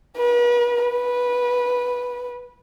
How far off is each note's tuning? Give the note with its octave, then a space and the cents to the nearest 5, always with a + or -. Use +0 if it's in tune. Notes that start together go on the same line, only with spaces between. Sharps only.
B4 -40
B4 -10